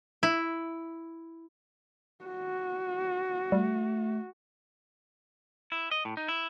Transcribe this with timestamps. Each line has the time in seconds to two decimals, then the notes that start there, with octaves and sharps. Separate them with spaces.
0.23 E4
2.25 F#4
3.52 G3 A3
5.72 E4
5.91 D#5
6.05 A2
6.17 D#4
6.28 E4